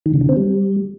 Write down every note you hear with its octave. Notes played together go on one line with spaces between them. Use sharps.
D#3
C#3
D3
C4
G3